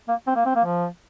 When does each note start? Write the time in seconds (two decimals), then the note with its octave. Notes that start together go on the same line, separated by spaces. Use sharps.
0.09 A#3
0.27 C4
0.36 A#3
0.46 C4
0.56 A#3
0.65 F3